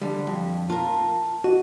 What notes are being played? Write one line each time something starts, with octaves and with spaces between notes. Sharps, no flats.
D3 G3
F2
F4 A#4 A5
F#4 D#5